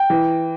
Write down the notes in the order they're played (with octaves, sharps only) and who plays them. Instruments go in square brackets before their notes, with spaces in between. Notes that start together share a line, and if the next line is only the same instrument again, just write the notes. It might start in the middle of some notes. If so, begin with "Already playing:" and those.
Already playing: [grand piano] G5
[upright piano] E3